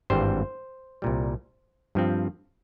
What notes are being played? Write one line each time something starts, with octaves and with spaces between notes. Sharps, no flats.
G#1 G2 E3 G3 C4 C5
C2 A#2 G3
G2 F3 C4